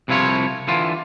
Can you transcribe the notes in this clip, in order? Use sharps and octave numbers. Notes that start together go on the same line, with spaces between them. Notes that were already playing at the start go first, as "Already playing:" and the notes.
C2 C3 F3 E4 F4 C#5
D3 E3 F4